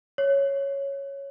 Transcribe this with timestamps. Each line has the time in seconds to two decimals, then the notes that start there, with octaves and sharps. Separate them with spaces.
0.18 C#5